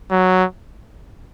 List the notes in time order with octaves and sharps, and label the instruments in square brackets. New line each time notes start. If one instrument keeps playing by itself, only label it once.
[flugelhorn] F#3